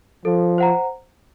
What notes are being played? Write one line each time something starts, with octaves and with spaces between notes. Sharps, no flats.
F3 A4
C5 F#5 A#5